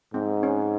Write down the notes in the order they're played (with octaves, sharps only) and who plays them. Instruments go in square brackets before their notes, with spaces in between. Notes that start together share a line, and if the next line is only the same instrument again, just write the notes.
[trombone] G#2 [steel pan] C4
[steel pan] C#4